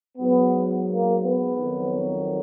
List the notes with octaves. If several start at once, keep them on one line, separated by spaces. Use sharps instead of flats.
G#2 F#3 B3
A#3
B3
F2 D#3 F#3